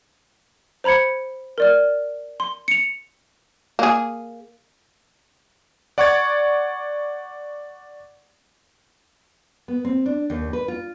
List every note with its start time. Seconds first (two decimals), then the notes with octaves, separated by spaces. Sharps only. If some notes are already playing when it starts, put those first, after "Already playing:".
0.84 C5 A#5 B5 G#6 C#7
1.58 A#4 D5 F6
2.40 C6
2.68 C#7 F7
3.79 A#3 G#4
5.98 D5 F#5 C#6 D6 G#6 A6
9.68 B3
9.85 C4
10.06 D4
10.30 D#2
10.53 B4
10.68 F4